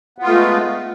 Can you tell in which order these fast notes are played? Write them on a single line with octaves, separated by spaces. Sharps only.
B3 F4 A3 G#3